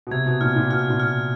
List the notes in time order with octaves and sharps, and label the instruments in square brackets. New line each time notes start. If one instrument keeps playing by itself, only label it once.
[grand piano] B2
[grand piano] C3 [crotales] G#6
[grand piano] B2
[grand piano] A#2 [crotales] F6
[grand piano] A#2
[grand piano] B2 [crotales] F6
[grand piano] A#2
[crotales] F6